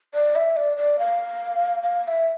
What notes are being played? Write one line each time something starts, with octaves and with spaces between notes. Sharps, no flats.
D5
E5
D5
D5
F5
F5
F5
E5